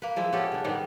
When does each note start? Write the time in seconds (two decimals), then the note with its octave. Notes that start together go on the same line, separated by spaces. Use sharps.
0.02 A#3 B4
0.16 F3 G#3 E4
0.32 B3 C#4 G4 A4
0.52 C#3 D4
0.64 G#2 D#3 G3 B3